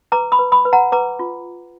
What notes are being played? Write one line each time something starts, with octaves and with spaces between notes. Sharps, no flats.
B4 A#5 D6
B5 D#6
B4
B5 D#6
B4
F#5 A#5
B4 A#5 D6
F4